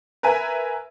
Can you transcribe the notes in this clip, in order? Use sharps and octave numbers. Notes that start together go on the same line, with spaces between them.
A#4 B4 E5 G#5